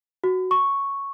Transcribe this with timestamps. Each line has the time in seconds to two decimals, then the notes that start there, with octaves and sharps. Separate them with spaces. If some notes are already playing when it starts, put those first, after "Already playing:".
0.24 F#4
0.51 C#6